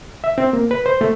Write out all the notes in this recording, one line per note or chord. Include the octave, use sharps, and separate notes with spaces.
E5
C4
A#3
B4
C5
A3